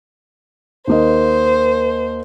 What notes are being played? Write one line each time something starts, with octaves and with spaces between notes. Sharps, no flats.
D#2 A#3 C5 D#5